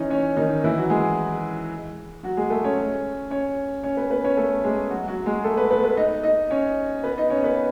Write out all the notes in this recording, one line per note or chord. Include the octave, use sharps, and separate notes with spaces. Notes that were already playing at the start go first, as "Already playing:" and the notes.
Already playing: E3 C#4 D#4 E4 C#5 D#5
C#4 C#5
D#3 D#4
E3 E4
F#3 F#4
G#3 G#4
F#3 F#4
G#3 G#4
A3 A4
C#4 C#5
C#4 C#5
C#4 C#5
B3 B4
B3 B4
C#4 C#5
A3 A4
G#3 G#4
F#3 F#4
F#3 F#4
G#3 G#4
A3 A4
B3 B4
B3 B4
B3 B4
D#4 D#5
D#4 D#5
C#4 C#5
B3 B4
D#4 D#5
C#4 C#5
B3 B4